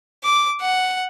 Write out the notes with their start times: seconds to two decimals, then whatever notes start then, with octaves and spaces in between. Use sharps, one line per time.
0.24 D6
0.61 F#5